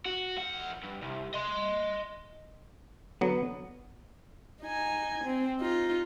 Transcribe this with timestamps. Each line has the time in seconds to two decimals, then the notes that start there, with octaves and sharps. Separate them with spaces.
0.05 F#4
0.36 F2 F#5
0.83 G2
1.02 C2
1.34 D#5 C6
3.21 D3 F#3 B3
4.63 D#4 G#5
5.24 C4
5.60 D#4 F4